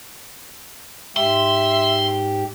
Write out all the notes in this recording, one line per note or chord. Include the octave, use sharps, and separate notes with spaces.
G#2 G4 E5 C6